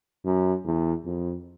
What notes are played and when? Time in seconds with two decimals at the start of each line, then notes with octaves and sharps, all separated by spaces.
0.25 F#2
0.65 E2
1.05 F2